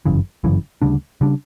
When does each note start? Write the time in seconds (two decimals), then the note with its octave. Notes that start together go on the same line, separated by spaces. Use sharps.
0.06 G1 F#2 C#3 E3
0.44 G1 F#2 C#3 E3
0.82 D2 C#3 G3 D4
1.21 C#3 G3 D4